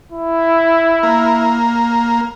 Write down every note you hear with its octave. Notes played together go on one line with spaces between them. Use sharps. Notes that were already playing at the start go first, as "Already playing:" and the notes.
E4
A#3